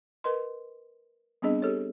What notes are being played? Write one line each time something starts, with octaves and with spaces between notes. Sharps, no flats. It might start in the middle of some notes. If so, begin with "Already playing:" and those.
A#4 B4 D#5 C6
G3 B3 C4 D4 G#4 D#5
G4 A4 C#5